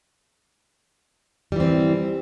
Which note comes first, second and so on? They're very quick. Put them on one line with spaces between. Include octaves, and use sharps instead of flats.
G3 E3 C4